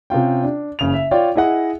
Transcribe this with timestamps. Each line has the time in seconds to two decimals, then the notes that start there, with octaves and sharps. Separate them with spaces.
0.10 C3 C#4 F4 G5
0.44 D4
0.79 F#1 C#3 F7
0.94 E5
1.11 F4 C#5 D5 G5
1.36 E4 G#4 D#5 F#5